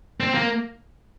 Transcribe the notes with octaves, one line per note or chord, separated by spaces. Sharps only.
C4
A#3